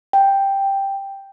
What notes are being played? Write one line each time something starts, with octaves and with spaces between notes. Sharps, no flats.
G5